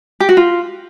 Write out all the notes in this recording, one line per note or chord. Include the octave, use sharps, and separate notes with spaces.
G4
F#4
F4